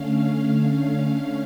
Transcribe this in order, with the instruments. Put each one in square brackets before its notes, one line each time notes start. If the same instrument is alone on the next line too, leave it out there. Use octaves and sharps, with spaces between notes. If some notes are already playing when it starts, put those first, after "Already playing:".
Already playing: [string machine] D3 A3 C#4 F5